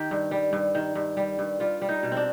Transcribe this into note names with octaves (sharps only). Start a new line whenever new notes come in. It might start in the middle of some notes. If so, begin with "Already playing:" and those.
Already playing: D#3 G4
G2
G3
G2
D#3
G2
G3
G2
G3 F4
G3
D#4
B2
C4
D4